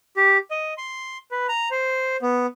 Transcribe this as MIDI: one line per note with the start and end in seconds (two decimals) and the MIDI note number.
0.17 0.37 67
0.51 0.74 75
0.78 1.18 84
1.31 1.47 71
1.49 1.69 82
1.71 2.17 72
2.22 2.46 59